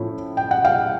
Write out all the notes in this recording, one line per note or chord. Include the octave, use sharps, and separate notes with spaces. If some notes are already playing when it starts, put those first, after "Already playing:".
Already playing: A2 F3 A3 C#4 E4
G5
F#5
F5 G5